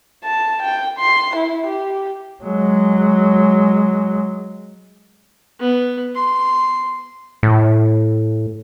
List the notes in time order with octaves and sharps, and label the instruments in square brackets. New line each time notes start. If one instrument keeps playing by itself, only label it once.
[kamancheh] A5
G5
C6
E4
G4
[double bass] F#3 G#3
[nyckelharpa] B3
C6
[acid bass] A2